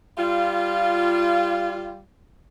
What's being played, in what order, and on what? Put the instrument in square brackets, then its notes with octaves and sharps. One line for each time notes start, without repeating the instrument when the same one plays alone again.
[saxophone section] G3 F4